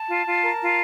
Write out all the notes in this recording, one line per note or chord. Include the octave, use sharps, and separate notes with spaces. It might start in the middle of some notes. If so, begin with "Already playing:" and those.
Already playing: A5
F4
F4
A#4
F4